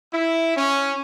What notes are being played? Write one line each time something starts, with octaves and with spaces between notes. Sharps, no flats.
E4
C#4